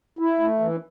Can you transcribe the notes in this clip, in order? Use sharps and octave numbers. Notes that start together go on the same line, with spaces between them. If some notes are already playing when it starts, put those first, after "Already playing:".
E4
A3
E3